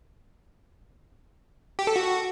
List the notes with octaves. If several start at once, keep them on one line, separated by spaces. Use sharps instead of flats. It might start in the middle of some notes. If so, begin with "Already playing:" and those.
G4
A4
F#4